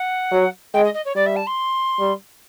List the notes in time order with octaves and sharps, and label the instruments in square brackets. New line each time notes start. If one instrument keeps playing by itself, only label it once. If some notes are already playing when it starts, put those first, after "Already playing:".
Already playing: [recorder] F#5
[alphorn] F#3
[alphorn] G#3 [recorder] G5
[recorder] D#5
D#5
C#5
[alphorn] G3 [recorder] D5
[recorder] E5
A5
C6
[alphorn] G3